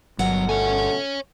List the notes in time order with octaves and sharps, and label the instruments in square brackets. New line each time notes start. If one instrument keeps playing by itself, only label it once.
[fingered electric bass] G1 [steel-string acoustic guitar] B2 A#4 F#5 [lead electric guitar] F#3
[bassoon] A3 [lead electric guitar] C#5 G#5